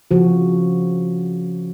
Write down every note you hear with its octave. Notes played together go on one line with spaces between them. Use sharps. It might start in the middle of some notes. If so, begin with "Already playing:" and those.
C#3 F3 F#4